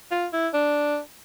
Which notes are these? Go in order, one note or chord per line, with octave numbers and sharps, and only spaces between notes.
F4
E4
D4